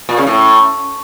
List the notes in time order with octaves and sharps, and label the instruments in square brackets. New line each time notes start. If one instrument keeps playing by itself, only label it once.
[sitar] A#2
C#3
A2